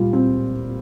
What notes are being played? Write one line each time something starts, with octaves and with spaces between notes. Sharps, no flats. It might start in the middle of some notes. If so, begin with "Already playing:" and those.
Already playing: A#2 G3 F4
C4